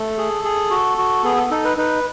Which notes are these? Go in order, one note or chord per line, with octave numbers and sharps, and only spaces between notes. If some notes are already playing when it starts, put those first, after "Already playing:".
Already playing: A3 A4
G#4
G#4
F#4
F#4
B3 G#4
A4
D#4 A4
B4
D#4 B4